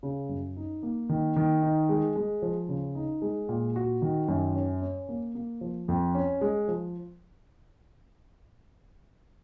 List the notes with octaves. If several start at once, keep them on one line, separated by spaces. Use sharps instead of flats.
C#3
F#2
D#4
A#3
D#3
D#3
D#4
G#3
G#3
F3
C#3
D#4
G#3
A#2
F#4
D#3
F#2
C#4
C#4
A#3
A#3
F3
F2
C#4
G#3
F3